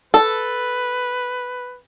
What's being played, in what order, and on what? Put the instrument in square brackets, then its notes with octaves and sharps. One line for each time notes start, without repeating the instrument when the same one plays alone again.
[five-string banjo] A4 [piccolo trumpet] B4